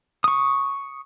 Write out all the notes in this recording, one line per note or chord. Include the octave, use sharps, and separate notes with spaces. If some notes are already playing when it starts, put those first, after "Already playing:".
C#6 D#6